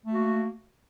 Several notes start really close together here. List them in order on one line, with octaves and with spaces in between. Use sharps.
A3 F#4 A#3